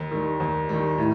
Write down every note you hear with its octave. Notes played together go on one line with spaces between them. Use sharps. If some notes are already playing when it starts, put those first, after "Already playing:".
Already playing: D#2
D#3 G3
D#2
D#3 G3
A2